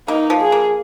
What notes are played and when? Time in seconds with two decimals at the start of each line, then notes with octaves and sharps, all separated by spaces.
0.08 A#3 D#4
0.30 F3
0.41 G#4
0.52 A#3